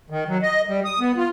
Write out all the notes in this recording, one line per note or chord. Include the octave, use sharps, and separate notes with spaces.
D#3
F#3
D#5
G3
D#6
B3
F4